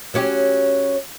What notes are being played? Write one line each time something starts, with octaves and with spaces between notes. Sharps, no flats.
F#3 C#4 G4